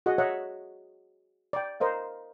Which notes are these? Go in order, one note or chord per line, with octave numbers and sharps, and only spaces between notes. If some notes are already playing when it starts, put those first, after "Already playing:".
F#4 G#4 D#5 F#5
C#5 D#5 E5 F#5 A#5
D5 G5
A#4 C5 D#5 F5